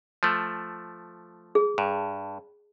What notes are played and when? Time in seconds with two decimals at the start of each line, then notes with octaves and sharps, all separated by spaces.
0.23 F3 A3
1.55 G#4
1.78 G2